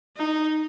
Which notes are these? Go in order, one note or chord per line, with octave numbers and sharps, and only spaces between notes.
D#4